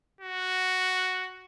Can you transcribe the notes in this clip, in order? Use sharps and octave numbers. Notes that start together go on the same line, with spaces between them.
F#4